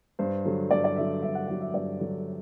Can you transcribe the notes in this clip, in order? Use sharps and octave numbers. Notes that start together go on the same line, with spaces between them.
G2 C5
D3 F#3
G2 D5
D5
D3 F#3 E5
G2 E5
F#5
D3 F#3 F#5
E5
G2 D5
D3 F#3